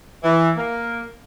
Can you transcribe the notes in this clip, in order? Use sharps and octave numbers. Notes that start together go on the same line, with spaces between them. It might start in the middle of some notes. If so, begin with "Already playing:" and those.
E3
A#3